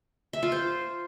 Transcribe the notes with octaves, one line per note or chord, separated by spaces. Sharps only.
E5
F4
C5